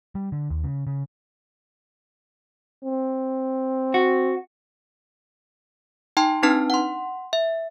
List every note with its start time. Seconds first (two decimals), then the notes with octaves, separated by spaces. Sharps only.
0.15 G3
0.32 D3
0.50 D#2
0.64 C#3
0.87 C#3
2.84 C4
3.94 F#4
6.17 D#4 G5 A5 C6
6.43 C4 D4 D#4 B4 A5 F6
6.70 F#5 C6
7.33 E5